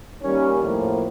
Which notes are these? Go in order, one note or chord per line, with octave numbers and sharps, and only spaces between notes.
D#3 G3 A#3 C#4
A2 F3 A#3